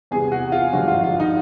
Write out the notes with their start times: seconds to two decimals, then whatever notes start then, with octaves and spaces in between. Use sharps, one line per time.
0.11 E2 C3 E3 G#4
0.32 F#4
0.52 F4
0.72 G#1 G2 D3 F3 F#4
0.88 F4
1.04 F4
1.20 D#4